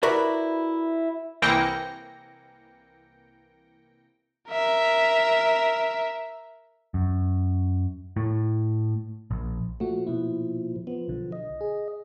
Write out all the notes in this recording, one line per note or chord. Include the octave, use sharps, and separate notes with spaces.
E4 F#4 A#4 B4 D5
C2 E3 A#3 G5 A#6 C#7
A#4 E5
F#2
A2
A#1
A#2 F3 A3 F#4
B2 E4
F3 B3
B1 D3
D#5
G#4